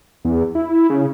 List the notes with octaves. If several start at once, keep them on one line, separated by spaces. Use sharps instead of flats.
E2
E4
C#3